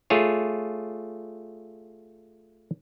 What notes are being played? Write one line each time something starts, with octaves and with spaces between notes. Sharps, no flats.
A3 F4 G#4 C#5